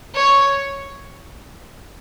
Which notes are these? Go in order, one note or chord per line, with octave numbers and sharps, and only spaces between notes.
C#5